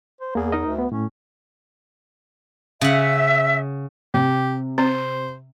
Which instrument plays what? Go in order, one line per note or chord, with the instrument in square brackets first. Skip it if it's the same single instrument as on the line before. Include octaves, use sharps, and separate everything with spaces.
[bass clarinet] C5
[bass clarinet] E2 [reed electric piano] A#3 G#4
[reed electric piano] D#4 A#4 D#5
[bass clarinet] D2
[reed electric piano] B3
[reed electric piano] A2 [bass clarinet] C#4
[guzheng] C#3 F#5 [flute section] E5
[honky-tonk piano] C3 [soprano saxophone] G4
[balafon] C4 [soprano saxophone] C5